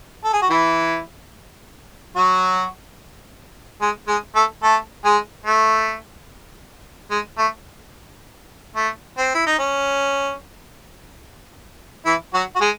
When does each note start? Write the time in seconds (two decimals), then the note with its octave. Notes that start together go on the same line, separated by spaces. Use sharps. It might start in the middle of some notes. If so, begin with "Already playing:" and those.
0.24 A4
0.33 G#4
0.42 F#4
0.50 E3 E4
2.16 F#3 F#4
3.81 G#3 G#4
4.08 G#3 G#4
4.35 A3 A4
4.63 A3 A4
5.05 G#3 G#4
5.45 A3
7.11 G#3
7.38 A3
8.76 A3
9.18 C4
9.34 E4
9.47 D#4
9.59 C#4
12.06 E3 E4
12.34 F#3 F#4
12.56 F#4
12.61 G#3 G#4